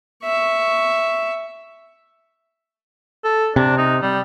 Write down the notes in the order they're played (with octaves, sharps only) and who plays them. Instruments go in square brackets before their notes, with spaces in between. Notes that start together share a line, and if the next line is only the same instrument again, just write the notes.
[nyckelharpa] E5 C#6
[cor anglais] A4
[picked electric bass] C3 [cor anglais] D4
[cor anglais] D#4
G3